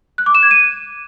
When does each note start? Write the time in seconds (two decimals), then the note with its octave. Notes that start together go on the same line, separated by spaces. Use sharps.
0.18 F#6
0.26 D6
0.35 E7
0.43 G#6
0.51 D#7